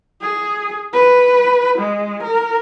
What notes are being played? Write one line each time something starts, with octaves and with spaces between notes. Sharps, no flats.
G#4
B4
G#3
A#4